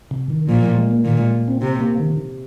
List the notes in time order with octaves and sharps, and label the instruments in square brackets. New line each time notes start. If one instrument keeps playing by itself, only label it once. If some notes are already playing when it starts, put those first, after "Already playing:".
[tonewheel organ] C3
D#3
[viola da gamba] A#2 [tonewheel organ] F3
[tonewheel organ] F3
G#3
A#3
[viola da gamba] A#2 [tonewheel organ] D#3
[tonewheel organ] G#3
C4
[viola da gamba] C3 [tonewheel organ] C4
[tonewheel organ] A#3
D#3